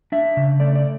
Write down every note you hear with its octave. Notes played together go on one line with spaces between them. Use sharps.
D4 E5
C#3
A3 D5
D5